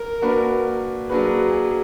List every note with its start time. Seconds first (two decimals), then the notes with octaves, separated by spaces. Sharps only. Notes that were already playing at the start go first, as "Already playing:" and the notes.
Already playing: A#4
0.22 A#3 D4 F#4 B4
1.09 F#3 A#3 D4 F#4 G#4 B4